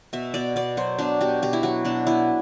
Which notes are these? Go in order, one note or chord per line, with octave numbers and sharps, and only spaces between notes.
B2 E5
B2 D5
B2 D5
F#3 C5
B2 D4
B2 G4
B2 G4
E4
F#3 F#4
B2 D4
B3 E4